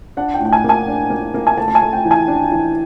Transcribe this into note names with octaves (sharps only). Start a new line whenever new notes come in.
D4 F#5
G5
A2
G5
G#5
A#3
G#5
D4
A#3
A#3
G#5
A3 A5
A5
G#5
A3
G5
E3
G#5
D4
E3